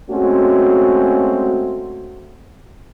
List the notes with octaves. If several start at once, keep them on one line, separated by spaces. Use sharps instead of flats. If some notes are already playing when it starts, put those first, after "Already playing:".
G#3 A3 C4 C#4 F#4